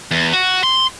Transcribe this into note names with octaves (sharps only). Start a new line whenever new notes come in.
E2
F#4
C6